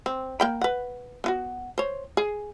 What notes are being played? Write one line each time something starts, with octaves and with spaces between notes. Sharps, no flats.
C4
A#3 G5 B5
B4 F#5
B3 F4 F#4
C5 C#5
G#4